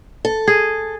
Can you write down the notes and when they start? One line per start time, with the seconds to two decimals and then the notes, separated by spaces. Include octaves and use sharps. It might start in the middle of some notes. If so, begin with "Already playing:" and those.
0.25 A4
0.48 G#4